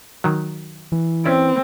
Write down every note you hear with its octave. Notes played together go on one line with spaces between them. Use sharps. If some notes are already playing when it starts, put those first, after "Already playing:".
D#3 F#3
E3
C4 C#4 E4 D5